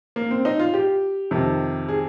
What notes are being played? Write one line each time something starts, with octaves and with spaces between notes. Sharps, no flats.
A#3
C4
D#4
F4
G4
F2 C3 D#3
G#4